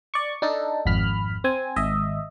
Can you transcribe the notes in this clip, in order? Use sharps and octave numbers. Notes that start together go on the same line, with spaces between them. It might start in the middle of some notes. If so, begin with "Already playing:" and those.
D5 C#6
D4 D#4 A4
G#1 F2 B5 F6
C4 G#5
G#1 D#5 E5